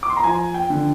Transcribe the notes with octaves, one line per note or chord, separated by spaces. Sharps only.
D6
C6
A#5
F3 G#5
G5
D3